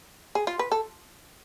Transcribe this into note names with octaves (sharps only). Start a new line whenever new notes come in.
G#4
F4
B4
A4